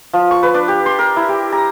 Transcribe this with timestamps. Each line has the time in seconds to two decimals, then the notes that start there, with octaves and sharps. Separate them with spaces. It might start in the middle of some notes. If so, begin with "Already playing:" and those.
0.13 F3
0.31 C#6
0.43 B4
0.54 D4
0.68 G4
0.86 C6
0.99 A#4
1.16 E4
1.29 G4
1.52 A#5